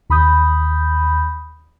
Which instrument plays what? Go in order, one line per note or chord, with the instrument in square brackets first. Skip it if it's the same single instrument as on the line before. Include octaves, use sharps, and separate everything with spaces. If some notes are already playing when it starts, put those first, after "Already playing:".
[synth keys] D#2 B5 D#6 G6